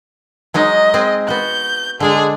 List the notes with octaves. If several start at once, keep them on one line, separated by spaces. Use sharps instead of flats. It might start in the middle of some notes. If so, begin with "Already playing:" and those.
F#3 G#3 D#4 D#5
G#3 C4 G#4
B3 F#4 G6
D3 G#3 D4 G#4